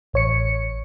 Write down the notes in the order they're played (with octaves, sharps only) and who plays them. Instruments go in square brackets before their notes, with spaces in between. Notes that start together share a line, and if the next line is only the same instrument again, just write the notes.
[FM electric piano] A1 C#5 C#7